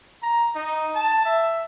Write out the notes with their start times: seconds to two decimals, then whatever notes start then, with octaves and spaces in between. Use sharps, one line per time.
0.23 A#5
0.56 D#4
0.95 A5
1.26 E5